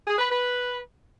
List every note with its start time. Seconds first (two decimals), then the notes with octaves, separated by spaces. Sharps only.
0.07 G#4
0.19 B4
0.30 B4